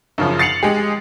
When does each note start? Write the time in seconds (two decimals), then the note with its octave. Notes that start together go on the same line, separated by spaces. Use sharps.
0.18 F#2 C#3 F3
0.39 A6 C7 C#7 F7 F#7
0.63 G#3 G4 G#4